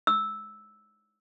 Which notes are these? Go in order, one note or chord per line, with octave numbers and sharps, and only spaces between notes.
E6